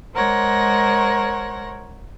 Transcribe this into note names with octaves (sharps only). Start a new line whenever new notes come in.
G#3 A#4 C5 C#5 F#5 A#6